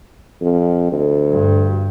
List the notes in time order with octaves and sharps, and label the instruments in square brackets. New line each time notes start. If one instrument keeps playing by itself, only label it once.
[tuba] F2
D2
[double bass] G2